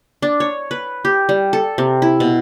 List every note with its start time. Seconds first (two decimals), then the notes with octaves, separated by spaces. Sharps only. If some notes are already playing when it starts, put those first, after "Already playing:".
0.22 D4
0.40 C#5
0.71 B4
1.05 G4
1.29 G3
1.53 A4
1.78 C3
2.02 E4
2.20 B2